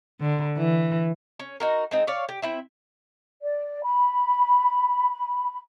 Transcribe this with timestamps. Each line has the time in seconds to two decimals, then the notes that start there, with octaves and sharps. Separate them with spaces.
0.21 D3
0.57 E3
1.40 C#4
1.60 D#4 F#4 A#4
1.91 G#3 C4 D#4
2.07 C#5 D5 F5
2.29 G4
2.42 C4 E4 E5
3.42 D5
3.84 B5